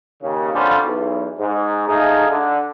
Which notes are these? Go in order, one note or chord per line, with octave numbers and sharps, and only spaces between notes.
D#2 C#3
F2 D3 G3 C#4 F4
B1 E2
G#2
A3 D#4 F4 G#4
D3